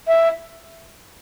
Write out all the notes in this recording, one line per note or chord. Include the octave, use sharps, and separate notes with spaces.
E5